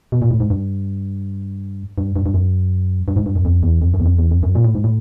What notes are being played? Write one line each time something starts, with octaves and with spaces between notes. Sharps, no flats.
B2
A#2
A2
G#2
G2
G2
G2
G2
F#2
G2
G#2
G2
F#2
F2
E2
F2
F#2
E2
F2
E2
F2
F#2
A#2
A2
G#2
A2